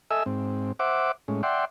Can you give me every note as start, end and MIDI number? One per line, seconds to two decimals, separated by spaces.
0.11 0.23 69
0.11 0.23 75
0.11 0.23 76
0.11 0.23 80
0.11 0.23 88
0.26 0.72 44
0.26 0.72 60
0.79 1.12 72
0.79 1.12 76
0.79 1.12 78
0.79 1.12 86
1.28 1.42 45
1.28 1.42 56
1.28 1.42 61
1.43 1.65 74
1.43 1.65 76
1.43 1.65 78
1.43 1.65 79
1.43 1.65 84